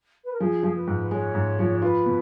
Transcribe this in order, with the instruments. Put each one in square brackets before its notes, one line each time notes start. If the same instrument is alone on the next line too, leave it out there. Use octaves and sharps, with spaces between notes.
[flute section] B4
A#4
[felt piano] F3 [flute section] G#4
[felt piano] F3
[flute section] B4
[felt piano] G#2
[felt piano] G#3 [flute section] C#5
[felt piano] G#2
F3
[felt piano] F4 [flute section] B4
[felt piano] B2